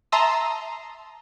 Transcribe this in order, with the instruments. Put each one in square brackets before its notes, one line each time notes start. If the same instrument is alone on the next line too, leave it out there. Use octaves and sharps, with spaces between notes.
[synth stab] E5 A5 A#5 C6 D#6 E6